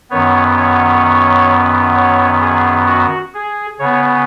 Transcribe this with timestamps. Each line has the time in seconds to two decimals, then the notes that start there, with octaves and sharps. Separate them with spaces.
0.10 F#2 D#3 B3 C#5
0.57 C#5
1.95 C#5
2.41 G#4
2.87 F#4
3.34 G#4
3.79 C#3 B3 C#5